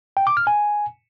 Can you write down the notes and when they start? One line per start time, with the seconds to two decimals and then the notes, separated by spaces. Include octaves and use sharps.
0.17 G5
0.27 D6
0.37 F6
0.47 G#5